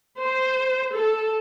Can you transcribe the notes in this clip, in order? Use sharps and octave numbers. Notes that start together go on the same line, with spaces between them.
C5
A4